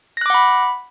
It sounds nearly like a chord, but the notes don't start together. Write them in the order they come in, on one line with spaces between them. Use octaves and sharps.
A#6 F#6 D6 F#5 B5